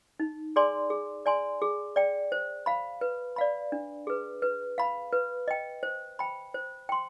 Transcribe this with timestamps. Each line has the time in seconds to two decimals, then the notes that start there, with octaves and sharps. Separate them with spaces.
0.20 D#4
0.56 G#4 D5 G#5 C6
0.90 G#4
1.26 D5 G#5 C6
1.62 G#4
1.96 D5 G5
2.32 C5
2.66 F5 B5
3.01 B4
3.36 D5 F5 B5
3.72 D4
4.07 G#4 B4
4.42 B4
4.78 F5 B5
5.12 B4
5.48 D#5 G5
5.83 C5
6.19 G5 B5
6.54 C5
6.89 G5 C6